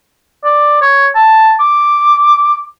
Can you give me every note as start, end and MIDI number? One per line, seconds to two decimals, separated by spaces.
0.44 0.77 74
0.81 1.08 73
1.15 1.55 81
1.60 2.63 86